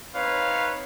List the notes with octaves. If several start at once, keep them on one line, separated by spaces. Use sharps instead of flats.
C4 D#4 B4 C#5 F5